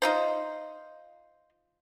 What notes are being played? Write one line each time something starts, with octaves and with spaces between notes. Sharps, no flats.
D#4 F4 C5